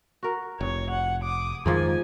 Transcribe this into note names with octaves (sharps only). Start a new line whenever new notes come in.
F#4 A#4
F1 C#5
F#5
D6 D#6
F2 G#2 D#3 F3 G#3 G#5